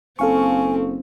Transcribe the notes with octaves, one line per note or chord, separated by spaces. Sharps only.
F#1 C4 A4 F5 G#5 C#6